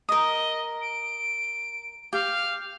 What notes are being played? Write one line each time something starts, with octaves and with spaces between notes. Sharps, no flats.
A#4 D#5 D#6
D7
G4 F5